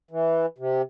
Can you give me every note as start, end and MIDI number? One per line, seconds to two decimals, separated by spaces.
0.11 0.46 52
0.58 0.82 48